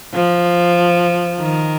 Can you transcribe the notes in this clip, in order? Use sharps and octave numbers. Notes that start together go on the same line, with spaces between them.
F3
D#3